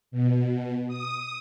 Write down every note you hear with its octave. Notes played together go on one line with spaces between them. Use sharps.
B2
D#6